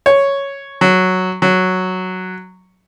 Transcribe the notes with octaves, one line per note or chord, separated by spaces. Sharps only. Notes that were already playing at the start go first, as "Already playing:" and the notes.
C#5
F#3
F#3